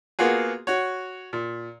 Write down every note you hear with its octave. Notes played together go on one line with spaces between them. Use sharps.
A#3 B3 F4 F#4 G#4
F#4 C#5
A#2